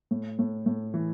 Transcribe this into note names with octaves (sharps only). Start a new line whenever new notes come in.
A2
A2
A2
E3